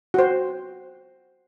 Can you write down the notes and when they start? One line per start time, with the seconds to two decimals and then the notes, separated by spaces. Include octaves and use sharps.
0.14 F#4 C5